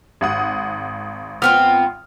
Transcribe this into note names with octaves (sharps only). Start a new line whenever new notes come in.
G#1 F#5 D#6
B3 C4 F4 F6